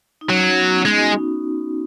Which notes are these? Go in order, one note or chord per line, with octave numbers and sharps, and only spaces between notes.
D#4
F#3 C#4
C#4
B3
C#4
G#3 D#4
F#4
D#4